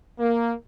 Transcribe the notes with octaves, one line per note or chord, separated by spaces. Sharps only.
A#3